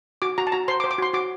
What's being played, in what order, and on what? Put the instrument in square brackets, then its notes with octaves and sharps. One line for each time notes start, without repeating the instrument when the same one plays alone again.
[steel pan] F#4 D6
F#4 A#5
A5
F#4 A#5
C5 C6
D6
C5
D6
F#4 C6
F#4 D6